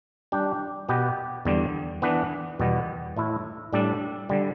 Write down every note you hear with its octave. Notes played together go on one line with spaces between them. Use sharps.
G3 D4 G4
B2 B3 G4 B4
E2 D3 G3
E3 B3 D4 B4
E2 B2 G3 B3
A2 A3 E4
A2 G3 D4 A4
D3 G3